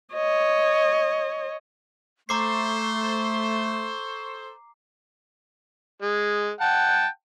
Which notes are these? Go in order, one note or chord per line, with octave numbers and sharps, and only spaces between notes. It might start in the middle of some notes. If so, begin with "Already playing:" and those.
C#5 D#5
A3 A4 C5 A#5 C#6 D6 C7
G#3
F#5 G5 A5